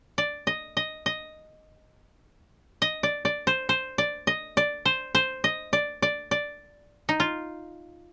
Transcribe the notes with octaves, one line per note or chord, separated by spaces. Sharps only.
D5
D#5
D#5
D#5
D#5
D5
D5
C5
C5
D5
D#5
D5
C5
C5
D#5
D5
D5
D5
D#4
F4